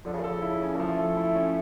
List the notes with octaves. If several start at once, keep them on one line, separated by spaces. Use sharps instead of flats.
D3 F3
C#3
A#2
C#3 A4
E4
C#4
A#3
F3 A3
A4
E4
C#4